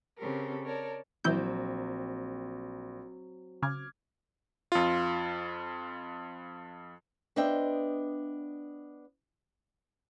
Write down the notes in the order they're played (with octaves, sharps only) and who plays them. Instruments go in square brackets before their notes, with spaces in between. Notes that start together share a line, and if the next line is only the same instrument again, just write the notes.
[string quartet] C#3 C4 G4 A4 A#4
A#4 C#5 D5 A5
[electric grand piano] A#1 [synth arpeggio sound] E3 E4 G6 [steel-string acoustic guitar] F#3 C4
[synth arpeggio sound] C#3 [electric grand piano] D6 F6 G#6
[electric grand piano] F2 F4
[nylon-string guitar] B3 D4 C5 D#5 E5 G5